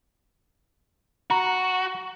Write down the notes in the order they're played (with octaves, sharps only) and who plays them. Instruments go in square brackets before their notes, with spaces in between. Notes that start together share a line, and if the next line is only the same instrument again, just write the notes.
[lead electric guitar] F#4 [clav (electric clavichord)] A#5